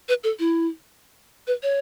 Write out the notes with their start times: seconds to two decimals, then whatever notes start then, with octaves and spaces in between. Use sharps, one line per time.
0.09 B4
0.24 A4
0.39 E4
1.47 B4
1.63 C#5